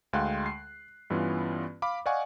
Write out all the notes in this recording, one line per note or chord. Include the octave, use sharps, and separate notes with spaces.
D2 G#3 F5 G5 C6 F#6
C7
G2 E3 B3 C#4 F4
F5 B5 D6
D5 D#5 F5 F#5 G#5 C#6